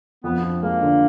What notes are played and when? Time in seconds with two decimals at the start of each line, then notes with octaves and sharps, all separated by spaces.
0.24 F2 B3
0.42 F3
0.63 G#3 A#3
0.81 D3